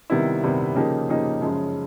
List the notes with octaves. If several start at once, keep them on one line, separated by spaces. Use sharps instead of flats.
C3 D#3 G3 B3 E4
C3 D#3 G3 B3 E4
C#3 F3 A#3 D#4 G4
C#3 F3 A#3 D#4 G4
F#2 C#3 F3 G#3